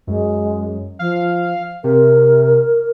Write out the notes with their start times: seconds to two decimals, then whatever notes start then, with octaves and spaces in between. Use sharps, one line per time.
0.07 F#2 G#3
0.99 F3 F5
1.84 C3 A#4